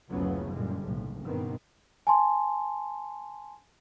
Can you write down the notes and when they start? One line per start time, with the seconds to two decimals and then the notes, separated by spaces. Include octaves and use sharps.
0.11 F#1 D2 C#3 F3 F#3 B3
0.52 F#2 A#2 D3 G3 G#3
0.83 F#1 B1 A2
1.23 G2 B2 D#3 B3 C4
2.07 G#5 A5 C6